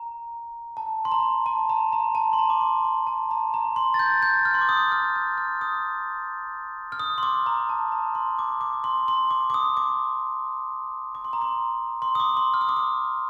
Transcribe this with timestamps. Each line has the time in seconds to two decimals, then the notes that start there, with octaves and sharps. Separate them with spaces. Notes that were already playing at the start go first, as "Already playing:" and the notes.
Already playing: A#5
0.77 A5
1.05 C6
1.12 A#5
1.46 A5
1.69 A#5
1.92 A#5
2.15 A5
2.33 C6
2.39 A#5
2.50 D6
2.61 C6
2.85 C6
3.07 A5
3.31 A#5
3.54 A#5
3.76 C6
3.94 A6
3.99 G6
4.23 G6
4.45 F6
4.54 C6
4.61 D6
4.69 D#6
4.92 F6
5.16 F6
5.38 F6
5.61 D#6
6.92 F6
7.00 D#6
7.18 C6
7.23 D6
7.46 A#5
7.69 A5
7.92 A#5
8.15 C6
8.39 D6
8.61 D6
8.84 C6
9.08 C6
9.31 D6
9.50 D6
9.54 D#6
9.77 D6
11.15 D6
11.25 C6
11.33 A#5
11.42 C6
12.02 C6
12.15 D#6
12.20 D6
12.37 C6
12.54 F6
12.61 D#6
12.69 D6
12.76 D#6